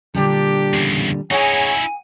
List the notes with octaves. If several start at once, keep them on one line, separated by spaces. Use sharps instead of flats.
A#2 D3 G3 D4 G4
E2 C#3
D#4 E4 G#4 C#5 F#5 G#5